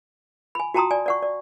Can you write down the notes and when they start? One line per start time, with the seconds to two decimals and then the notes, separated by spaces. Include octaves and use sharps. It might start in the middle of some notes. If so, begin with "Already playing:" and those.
0.55 G#5 B5
0.74 F#4 G5 A5 A#5 C6 D#6
0.91 D5 G#5
1.06 D5 F#5 C#6
1.22 D5